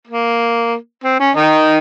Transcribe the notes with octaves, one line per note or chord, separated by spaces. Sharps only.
A#3
C4
C#4
D#3 D#4